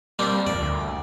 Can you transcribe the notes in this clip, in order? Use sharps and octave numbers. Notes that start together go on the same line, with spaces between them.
G3 A#3 C4 D4
F2 D5
D2